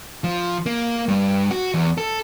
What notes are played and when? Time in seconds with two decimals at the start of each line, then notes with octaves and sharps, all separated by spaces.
0.24 F3
0.66 A#3
1.08 G2
1.51 F#4
1.74 E2
1.98 A4